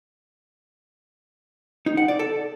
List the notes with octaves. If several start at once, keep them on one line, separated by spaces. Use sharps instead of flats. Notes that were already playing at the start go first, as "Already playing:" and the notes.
D#4
F#5
D5
A4